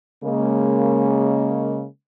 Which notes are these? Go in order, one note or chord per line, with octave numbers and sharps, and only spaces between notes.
C#3 G#3 A#3